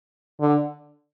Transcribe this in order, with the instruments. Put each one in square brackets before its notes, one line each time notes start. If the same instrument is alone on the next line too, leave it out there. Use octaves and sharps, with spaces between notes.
[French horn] D3